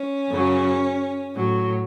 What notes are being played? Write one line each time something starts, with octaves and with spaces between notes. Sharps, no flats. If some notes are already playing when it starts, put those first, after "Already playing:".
Already playing: C#4
F#2 C#3 F#3
A2 F#3